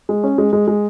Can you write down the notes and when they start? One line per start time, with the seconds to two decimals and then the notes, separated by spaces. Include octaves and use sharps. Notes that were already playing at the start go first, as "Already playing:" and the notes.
0.09 G#3
0.23 C#4
0.38 G#3
0.53 G#3
0.68 G#3